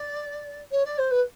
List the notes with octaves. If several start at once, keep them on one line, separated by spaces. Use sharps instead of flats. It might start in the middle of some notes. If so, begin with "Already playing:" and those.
Already playing: D5
C#5
D5
C5
B4